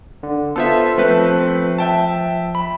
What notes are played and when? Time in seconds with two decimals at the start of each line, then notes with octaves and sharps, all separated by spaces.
0.23 D3
0.56 B3 F4 A4 C5 E5 B6
0.98 F3 A3 C4 B4
1.78 E5 G5 A5
2.55 B5